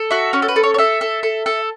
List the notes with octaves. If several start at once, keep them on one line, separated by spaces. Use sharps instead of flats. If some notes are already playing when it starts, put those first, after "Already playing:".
Already playing: A4
F#4 E5
C#4 C#5
A4
B4
A4
C#5
C#5
A4 E5
A4
A4
A4